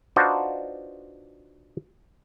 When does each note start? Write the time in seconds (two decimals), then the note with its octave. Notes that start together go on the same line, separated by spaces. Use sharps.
0.16 D4 D#4 F4 F#4 B4 C5